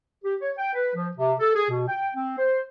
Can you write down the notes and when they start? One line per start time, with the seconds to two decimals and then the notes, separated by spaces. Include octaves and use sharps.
0.24 G4
0.41 C#5
0.58 G5
0.74 B4
0.95 F3
1.17 C3
1.40 A4
1.55 G#4
1.70 B2
1.88 G5
2.15 C4
2.38 C5